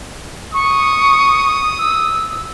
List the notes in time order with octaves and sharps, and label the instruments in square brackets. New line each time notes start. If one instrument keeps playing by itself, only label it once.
[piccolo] C#6 [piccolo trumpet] D#6
[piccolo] E6